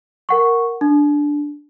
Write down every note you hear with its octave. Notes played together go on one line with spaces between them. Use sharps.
A#4 F#5 C#6
D4